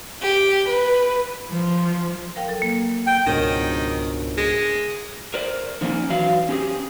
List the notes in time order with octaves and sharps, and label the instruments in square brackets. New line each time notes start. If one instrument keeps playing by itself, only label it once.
[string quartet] G4
B4
[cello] F3
[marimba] A#4 F5 G5
F#3 A4
A#3
[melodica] G5
[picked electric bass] C#2 G#2 B2 [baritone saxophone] D#3 [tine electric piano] D4 A#4 C#5
[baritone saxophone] G#3
[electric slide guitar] A#4 C5 D5
D3 F3 A#3 C4 C#4 D#4
E3 F#3 D5 F5
C#4 G4 G#4